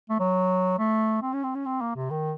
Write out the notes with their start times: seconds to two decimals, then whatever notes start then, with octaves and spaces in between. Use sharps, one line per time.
0.10 A3
0.20 F#3
0.79 A3
1.22 C4
1.33 C#4
1.44 C4
1.55 C#4
1.66 C4
1.81 A#3
1.96 C3
2.10 D#3